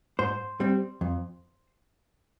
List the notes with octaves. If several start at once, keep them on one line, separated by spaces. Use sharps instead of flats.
G#2 C5
G3 C4
F2